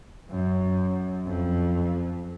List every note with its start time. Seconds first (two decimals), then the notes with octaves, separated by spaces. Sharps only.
0.30 F#2
1.26 F2